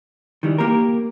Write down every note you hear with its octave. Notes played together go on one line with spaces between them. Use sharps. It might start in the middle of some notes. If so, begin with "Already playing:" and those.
D#3 E3 G3
A#3 G4 A#4